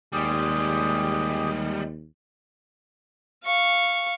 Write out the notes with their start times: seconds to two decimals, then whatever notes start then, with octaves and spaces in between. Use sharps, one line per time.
0.13 D#2 G3 G#3 G4 G#4
3.43 F5 C#6